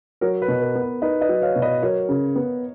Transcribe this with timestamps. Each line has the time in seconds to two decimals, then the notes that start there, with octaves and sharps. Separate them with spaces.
0.21 F#3 A#4 C#5
0.42 B4
0.48 B2
0.62 A#4
0.75 B3
0.81 B4
1.02 D#4 B4 D#5
1.21 B4 D#5
1.29 F#3
1.42 C#5 F5
1.56 B2
1.62 B4 D#5
1.83 F#3 A#4 C#5
2.09 C#3
2.36 B3